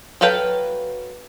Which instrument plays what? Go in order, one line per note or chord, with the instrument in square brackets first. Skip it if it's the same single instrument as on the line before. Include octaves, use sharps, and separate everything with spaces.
[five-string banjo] F#3 A4 B4 F5 G5